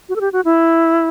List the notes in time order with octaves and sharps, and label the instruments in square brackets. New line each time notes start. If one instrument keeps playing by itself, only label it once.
[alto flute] F#4
A4
G4
F#4
E4